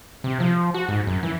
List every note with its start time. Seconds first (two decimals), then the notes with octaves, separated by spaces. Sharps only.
0.24 C3
0.40 F3
0.74 F#4
0.88 G#2
1.07 F#2
1.23 E3